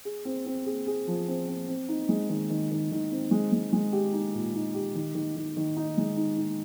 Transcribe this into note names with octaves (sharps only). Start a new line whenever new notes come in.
G#4
C4
C4
G#4
G#4
F3
C4
C4
C4
D#4
G#3
D#3
D#3
D#3
D#3
C4
G#3
G#3
G#3
G4
D#4
A#2
D#4
G4
D#3
D#3
D#3
D#3
D#4
G#3
D#4
D#4